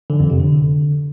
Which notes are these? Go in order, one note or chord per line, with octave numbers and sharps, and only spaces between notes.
D3
F2
C3
D3